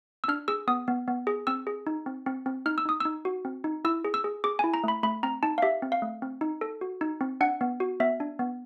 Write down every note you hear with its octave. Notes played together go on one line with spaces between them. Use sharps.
E6
D4 F6
G#4 E6
B3 D#6
B3
B3
G#4
C4 E6
G#4
D#4
C4
C4
C4
D#4 F6
E6
D#4 D#6
D#4 E6
F#4
C4
D#4
E4 E6
G#4
E6
G#4
G#4 D6
E4 G#5
A#5
A3 B5
A3 B5
C4 A#5
D#4 A5
F5
G4 E5
C4
F5
A3
C4
D#4
A4
F#4
D#4
C4
D4 F#5
B3
F#4
B3 E5
D4
B3